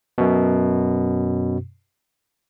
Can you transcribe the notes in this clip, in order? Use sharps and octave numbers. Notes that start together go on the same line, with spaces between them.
F#2 B2